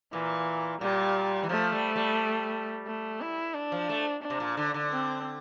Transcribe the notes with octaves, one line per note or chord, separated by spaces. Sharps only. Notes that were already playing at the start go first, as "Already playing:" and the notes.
A#2 E3
A#2 G3
E3
F3 A3
G3
G3
A3
E4
D4
F3
A3
D4
C3
A#2
D3
D3
C4